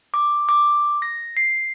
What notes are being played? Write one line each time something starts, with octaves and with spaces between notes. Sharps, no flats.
D6
D6
A#6
C7